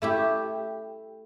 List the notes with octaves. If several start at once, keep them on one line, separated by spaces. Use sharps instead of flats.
A3 E4 G4